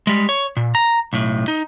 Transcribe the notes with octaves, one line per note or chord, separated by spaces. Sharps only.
G3 G#3
C#5
A#2
A#5
B1 A2
D#4